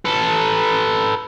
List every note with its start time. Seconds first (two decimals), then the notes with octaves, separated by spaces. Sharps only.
0.05 A4 B4